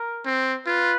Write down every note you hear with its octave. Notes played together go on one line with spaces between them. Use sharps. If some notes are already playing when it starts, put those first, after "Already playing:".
Already playing: A#4
C4
F4 B4